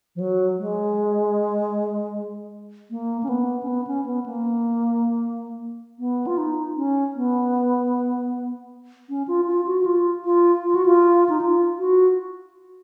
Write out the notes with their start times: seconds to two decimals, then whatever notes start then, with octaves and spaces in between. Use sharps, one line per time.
0.16 F3
0.20 F#3
0.58 G#3
2.91 A#3
3.23 C#4
3.29 B3
3.63 C#4
3.68 B3
3.87 C#4
4.06 B3
4.26 A#3
5.99 B3
6.27 F4
6.38 D#4
6.77 C#4
7.15 B3
9.10 C#4
9.28 F4
9.48 F4
9.67 F#4
9.81 F#4
9.86 F4
10.25 F4
10.64 F4
10.75 F#4
10.86 F4
11.29 D#4
11.41 F4
11.79 F#4